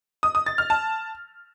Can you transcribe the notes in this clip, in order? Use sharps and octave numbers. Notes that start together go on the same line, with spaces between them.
D#6
D#6
A6
F6
A5